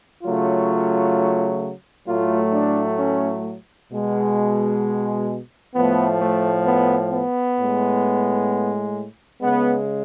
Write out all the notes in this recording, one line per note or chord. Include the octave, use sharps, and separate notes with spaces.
C#3 F#3 A3 F4
A2 F#3 A3 F4
D4
C#4
B2 G#3
A2 F3 A3 B3
A3
B3
B3
A2 G#3
C#3 G#3 B3